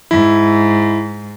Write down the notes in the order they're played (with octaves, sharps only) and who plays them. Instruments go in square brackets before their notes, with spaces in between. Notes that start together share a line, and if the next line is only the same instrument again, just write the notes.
[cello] G#2 [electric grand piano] E4